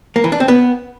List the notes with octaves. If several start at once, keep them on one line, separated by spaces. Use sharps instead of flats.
A#3
E3
D4
C4
B3